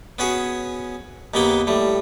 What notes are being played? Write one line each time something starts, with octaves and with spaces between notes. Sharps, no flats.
B3 C#4 F#4 G#4
D#2 C#3 A#3 B3 G5
A2 G3